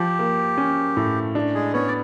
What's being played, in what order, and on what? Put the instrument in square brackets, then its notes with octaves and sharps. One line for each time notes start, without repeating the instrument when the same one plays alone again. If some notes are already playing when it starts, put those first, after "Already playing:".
Already playing: [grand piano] F3 [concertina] G4
[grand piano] A#3
C#4
A2
D4
[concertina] G#3 G#4
[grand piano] B3 [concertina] C#4 C#5
[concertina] D5